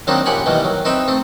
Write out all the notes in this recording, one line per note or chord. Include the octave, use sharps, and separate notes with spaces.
D#3 F#3 A#3 C4 D4 D#4
F#2 A#2 G4 F#5 G#5 B5
B2 D#3 E3 G3 A#3
F#3
C4 D#4 B4 E5 G5
A3 C4